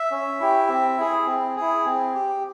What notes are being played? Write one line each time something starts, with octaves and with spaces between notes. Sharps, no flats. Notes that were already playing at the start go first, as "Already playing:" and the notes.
Already playing: E5
C#4
E4 G4
C4
E4 G#4
C4
E4 G#4
C4
G4